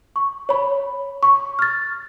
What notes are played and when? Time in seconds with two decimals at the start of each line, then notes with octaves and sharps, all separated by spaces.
0.16 C#6
0.49 C#5 B5
1.23 C#6
1.59 F6 A6